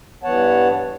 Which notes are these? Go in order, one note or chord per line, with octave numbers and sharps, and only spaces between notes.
G2 E3 B3 C#5 F#5 A5